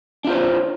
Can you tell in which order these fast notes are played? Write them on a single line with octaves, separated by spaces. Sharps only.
D4 F4 C5 C#5